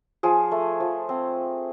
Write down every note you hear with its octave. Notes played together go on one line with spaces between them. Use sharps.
F3 G#4
A3
F3
C4